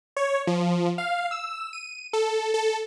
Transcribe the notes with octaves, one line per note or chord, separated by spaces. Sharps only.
C#5
F3
F5
E6
D#7
A4
A4